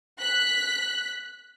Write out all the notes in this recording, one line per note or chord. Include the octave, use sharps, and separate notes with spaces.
F#6 B6